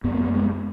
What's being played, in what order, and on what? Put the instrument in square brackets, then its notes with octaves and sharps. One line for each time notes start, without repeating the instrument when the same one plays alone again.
[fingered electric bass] F#2 B3
A#3
B3
G#3